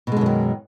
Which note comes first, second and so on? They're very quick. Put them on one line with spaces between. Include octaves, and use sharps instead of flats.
B2 G#3 D3 F#2 D#3